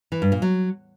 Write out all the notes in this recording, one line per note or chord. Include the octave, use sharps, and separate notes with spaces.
E3
G2
A#2
F#3